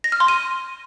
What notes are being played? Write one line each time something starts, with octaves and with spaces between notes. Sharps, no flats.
A#6
F6
C6
D#7